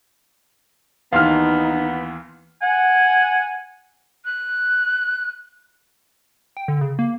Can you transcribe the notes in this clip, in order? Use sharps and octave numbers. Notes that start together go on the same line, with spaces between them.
D#2 E3 B3 D#4 F5 C6 F6
F#5 G#5
F#6
G5
D3
C#3
A#3